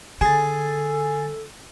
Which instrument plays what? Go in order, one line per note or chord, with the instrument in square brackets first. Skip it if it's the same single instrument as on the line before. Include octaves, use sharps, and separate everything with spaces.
[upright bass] D3 [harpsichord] G#4 [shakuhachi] A4 [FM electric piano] G#5 A6